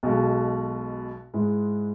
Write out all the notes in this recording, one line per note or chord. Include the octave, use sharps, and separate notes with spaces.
B1 B2 G#3
G#2 G#3 E4